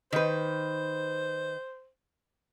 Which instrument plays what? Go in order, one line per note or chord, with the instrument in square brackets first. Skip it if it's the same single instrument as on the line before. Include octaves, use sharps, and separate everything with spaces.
[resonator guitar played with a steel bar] D#3 B4 [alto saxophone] C5